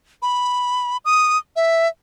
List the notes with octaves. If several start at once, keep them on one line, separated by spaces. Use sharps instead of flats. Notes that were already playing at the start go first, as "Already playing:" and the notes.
B5
D#6
E5